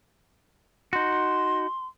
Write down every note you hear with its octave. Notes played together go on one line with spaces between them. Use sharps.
D#4 F#4 C6